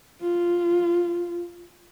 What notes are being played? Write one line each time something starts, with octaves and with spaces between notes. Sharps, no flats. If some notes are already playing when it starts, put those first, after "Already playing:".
F4